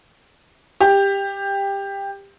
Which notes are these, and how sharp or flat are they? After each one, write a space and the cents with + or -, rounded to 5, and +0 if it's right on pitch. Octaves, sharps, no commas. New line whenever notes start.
G4 +15